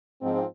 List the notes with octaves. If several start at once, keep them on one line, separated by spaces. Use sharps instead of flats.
G#2 F3 C4